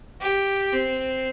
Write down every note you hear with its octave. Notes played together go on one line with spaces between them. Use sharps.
G4
C4